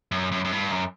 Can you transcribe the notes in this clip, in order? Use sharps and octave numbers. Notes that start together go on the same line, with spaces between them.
F#2
F#2
F#2
G2
F#2